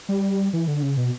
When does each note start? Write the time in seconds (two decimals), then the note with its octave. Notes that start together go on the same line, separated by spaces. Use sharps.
0.09 G3
0.53 E3
0.68 D3
0.83 C#3
0.97 B2